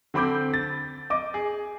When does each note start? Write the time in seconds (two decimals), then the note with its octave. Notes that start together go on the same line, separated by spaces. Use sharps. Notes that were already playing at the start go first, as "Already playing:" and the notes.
0.14 D3 C4 B5 D6 G6
0.54 A6
1.10 D#5 D6
1.34 G#4